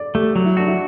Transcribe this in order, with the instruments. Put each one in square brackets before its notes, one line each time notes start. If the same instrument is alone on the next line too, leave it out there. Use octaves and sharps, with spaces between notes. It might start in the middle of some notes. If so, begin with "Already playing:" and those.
Already playing: [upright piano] D5
[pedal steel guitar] A3 [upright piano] G4
[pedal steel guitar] F#3
[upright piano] E4
[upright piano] D4 [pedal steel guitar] F#4
[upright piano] E4